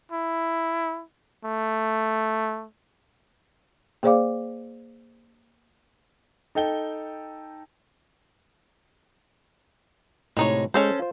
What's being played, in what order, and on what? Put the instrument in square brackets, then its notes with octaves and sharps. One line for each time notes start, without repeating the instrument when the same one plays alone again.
[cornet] E4
A3
[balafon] A#3 G#4 C5 D5 F5 D6
[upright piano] D#4 A4 G5 G7
[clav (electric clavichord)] A2 C3 [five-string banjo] G#3 D#4 C#5
[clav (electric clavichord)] G#3 [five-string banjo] C#4 A4 C5
[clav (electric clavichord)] F4 C5